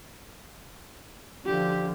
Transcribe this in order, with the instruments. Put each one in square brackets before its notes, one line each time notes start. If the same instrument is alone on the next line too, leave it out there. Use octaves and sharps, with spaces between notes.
[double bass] D3 F3 [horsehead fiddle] G4